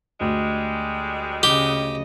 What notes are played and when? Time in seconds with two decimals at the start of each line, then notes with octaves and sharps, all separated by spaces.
0.21 D2 G3 G#3
1.43 C#3 G4 D#5